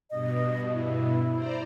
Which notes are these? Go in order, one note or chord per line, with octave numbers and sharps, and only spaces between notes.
G2 B2 D#5
E4
C5 D5 A#5